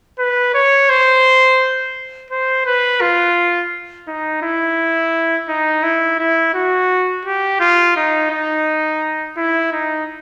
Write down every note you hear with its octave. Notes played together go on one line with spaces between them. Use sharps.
B4
C#5
C5
C5
B4
F4
D#4
E4
D#4
E4
E4
F#4
G4
F4
D#4
D#4
E4
D#4